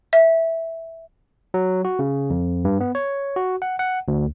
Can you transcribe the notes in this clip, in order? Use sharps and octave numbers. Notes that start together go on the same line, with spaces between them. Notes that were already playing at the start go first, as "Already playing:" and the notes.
E5
F#3
F#4
C#3
F2
G2
B3
C#5
F#4
F#5
F#5
D2